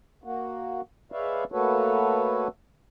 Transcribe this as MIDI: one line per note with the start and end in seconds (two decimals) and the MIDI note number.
0.24 0.81 58
0.24 0.81 66
1.12 1.44 56
1.12 1.44 71
1.12 1.44 73
1.12 1.44 74
1.12 1.44 76
1.12 1.44 77
1.52 2.48 57
1.52 2.48 58
1.52 2.48 66
1.52 2.48 69
1.52 2.48 71
1.52 2.48 73